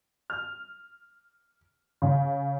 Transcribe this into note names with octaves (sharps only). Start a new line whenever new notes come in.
F6
C#3